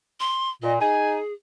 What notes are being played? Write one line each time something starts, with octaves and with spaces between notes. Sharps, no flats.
C6
A#2 D#5
D#4 G#4 G#5